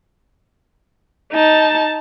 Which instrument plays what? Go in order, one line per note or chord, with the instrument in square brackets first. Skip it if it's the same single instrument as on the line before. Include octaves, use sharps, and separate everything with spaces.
[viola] D#4 A5